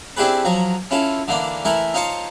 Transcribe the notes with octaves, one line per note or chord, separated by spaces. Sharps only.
C4 D4 E4 G4 G#4 B4
F3 F#3 A#5
C#4 E4 F4 A4
D3 E3 A#3 D4
E3 A3 E4 A#4 E5
D#4 F4 C5 C#5 A5 C#6